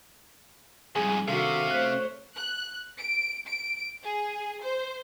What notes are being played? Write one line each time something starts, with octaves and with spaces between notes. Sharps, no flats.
F2 G#2 G3 G#4 G#5
C3 D#3 D4 F#4 A4 F5
A3 C5 C#5 F#6 B6
F#6
D7
D7
G#4
C5